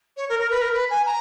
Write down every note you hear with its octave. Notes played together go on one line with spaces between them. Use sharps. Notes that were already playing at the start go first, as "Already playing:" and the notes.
C#5
A#4
A#4
B4
A#4
B4
G#5
A#5